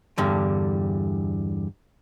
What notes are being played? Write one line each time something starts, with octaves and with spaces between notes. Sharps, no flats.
E2 G2 D3 G3